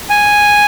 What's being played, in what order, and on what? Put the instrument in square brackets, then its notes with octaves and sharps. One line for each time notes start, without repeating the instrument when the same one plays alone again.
[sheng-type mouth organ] G#5